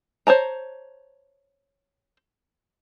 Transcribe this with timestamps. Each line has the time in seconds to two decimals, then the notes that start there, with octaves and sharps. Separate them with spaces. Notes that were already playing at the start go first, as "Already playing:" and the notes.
0.27 C5 C#5 A5 A#5